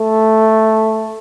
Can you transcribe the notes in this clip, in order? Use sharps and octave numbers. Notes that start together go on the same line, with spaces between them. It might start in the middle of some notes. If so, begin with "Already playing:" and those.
Already playing: A3